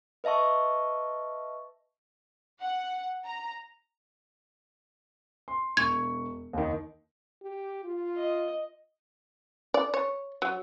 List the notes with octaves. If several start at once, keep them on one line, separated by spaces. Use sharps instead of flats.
B4 D#5 E5 A5 C#6
F#5
A#5
C6
E1 C#6 G#6
D#2 D#3
G4
F4
D#5
D5
C#5
F#3